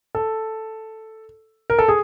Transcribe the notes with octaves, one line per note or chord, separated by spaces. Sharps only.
A4
A#4
A4
G#4